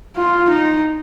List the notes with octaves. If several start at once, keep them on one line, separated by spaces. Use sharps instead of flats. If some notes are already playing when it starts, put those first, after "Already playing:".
F4
D#4